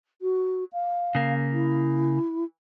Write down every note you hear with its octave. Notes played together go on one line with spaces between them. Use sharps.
F#4
F5
C#3 A#3
E4